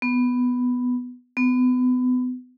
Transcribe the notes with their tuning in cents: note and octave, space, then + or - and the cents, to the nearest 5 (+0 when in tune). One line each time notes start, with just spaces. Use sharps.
B3 +5
B3 +30